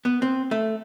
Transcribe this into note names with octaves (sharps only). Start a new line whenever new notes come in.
B3
C4
A3